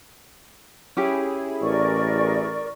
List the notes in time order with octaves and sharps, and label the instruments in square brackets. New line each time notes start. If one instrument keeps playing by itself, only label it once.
[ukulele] C#4 G4 [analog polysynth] E4 G#4
[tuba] A1 [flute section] A#4 D5 C#6